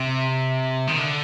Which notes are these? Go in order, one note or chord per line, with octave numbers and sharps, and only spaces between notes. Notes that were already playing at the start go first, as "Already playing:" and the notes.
Already playing: C3
D#3
D3